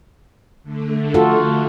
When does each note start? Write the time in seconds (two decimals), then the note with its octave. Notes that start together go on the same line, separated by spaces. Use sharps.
0.63 D3 A3
1.14 F4 F#4 A4